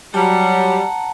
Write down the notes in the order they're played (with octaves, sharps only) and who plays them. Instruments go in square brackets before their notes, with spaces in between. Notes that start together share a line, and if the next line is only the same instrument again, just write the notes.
[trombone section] F#3 [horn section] G3 [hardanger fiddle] F#5 [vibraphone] A5 A#5